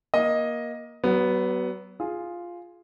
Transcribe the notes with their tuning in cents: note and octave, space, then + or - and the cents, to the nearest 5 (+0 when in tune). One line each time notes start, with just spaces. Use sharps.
A#3 +20 D#5 +5
F#3 +35 B3 +0
F4 +0 G#4 +0